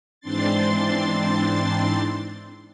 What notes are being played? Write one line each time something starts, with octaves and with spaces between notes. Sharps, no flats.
G#2 E3 C4 D4 C6 A6